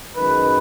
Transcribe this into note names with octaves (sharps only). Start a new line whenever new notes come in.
F#2 D#3 G#3 B4